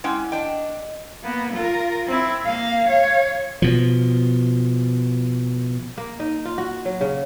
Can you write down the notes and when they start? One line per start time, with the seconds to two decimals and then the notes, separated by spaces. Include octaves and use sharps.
0.04 G#3 C#4 E4 F#5 G5 D6
0.32 D4 D#5 G5
1.23 A#3 B3
1.53 F4 A#4
2.07 C4 E4
2.45 A#3 F5
2.88 C#5 F5
3.62 B2 F3
5.97 A#3
6.20 D#4
6.45 F4
6.58 F#4
6.85 F#3
7.01 C#3